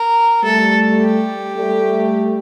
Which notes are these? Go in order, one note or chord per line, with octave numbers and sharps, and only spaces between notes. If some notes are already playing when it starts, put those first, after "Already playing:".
Already playing: A#4
G3 A3 A4
G4
G3 A3